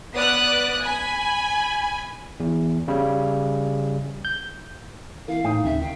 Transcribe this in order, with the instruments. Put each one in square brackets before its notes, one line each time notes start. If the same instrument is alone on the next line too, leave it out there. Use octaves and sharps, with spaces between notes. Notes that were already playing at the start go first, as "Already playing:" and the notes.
[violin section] B3 D5 D#6 F#6
G#5 B5
[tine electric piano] E2
C#3 G3
G6
[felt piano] E3 A#3 [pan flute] F5
[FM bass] A2 [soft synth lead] D#4 [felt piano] G5 D#6
[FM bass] D#2 [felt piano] C#3 [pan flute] E5
[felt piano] D#3 [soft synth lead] F5 [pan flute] G5